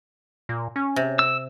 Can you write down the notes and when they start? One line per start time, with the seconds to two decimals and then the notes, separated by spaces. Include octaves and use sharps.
0.49 A#2
0.76 C#4
0.96 C3
1.19 E6